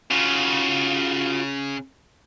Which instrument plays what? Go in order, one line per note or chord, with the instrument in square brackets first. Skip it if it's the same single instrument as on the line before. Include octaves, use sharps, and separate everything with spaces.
[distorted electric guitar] C#3 [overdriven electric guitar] F4 F#4